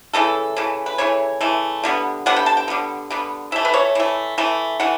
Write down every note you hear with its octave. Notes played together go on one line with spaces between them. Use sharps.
C#3 E3 A3 A4
C#3 E3 A3
B4
C#3 E3 A3 C#5
C#3 E3 A3
D3 G3 B3
D3 G3 B3 F#5
G5
A5
G5
D3 G3 B3
D3 G3 B3
E3 A3 E5
B4
C#5
E3 A3
E3 A3
E3 A3 F#5